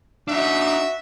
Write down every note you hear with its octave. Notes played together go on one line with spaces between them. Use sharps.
D4 D#4 F#4 E5